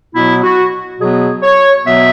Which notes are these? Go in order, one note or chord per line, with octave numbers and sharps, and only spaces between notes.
B2 F#3 B3 E4
F#4
B2 F#3 B3 G#4
C#5
B2 F#3 B3 E5